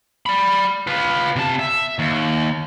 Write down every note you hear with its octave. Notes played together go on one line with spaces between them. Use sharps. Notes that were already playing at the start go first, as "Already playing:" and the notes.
D5 B5
F4 B4
C3 A5
E5
D#2